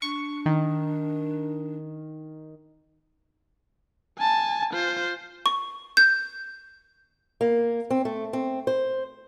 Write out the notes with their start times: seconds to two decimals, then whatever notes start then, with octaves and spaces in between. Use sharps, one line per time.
0.02 D4 C#6
0.46 D#3
4.18 G#5 A5
4.73 F4 C5
5.46 C#6
5.97 G6
7.41 A#3
7.90 C4
8.05 A3
8.33 C4
8.67 C5